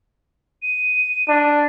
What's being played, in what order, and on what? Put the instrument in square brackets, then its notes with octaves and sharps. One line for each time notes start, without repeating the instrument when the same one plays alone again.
[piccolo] D#7
[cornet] D4